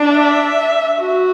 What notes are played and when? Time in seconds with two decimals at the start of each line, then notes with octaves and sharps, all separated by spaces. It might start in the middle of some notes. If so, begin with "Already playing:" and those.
Already playing: D4
0.14 E5
1.00 F#4